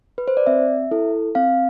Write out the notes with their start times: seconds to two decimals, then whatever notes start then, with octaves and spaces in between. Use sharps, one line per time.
0.18 B4
0.28 C5
0.37 D5
0.47 C4 E5
0.91 E4 A4
1.35 C4 F5